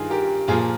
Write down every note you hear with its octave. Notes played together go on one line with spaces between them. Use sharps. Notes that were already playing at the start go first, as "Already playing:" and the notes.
Already playing: G2 D#3 F4 G#4
G4 A#4
A#2 F3 F4 G#4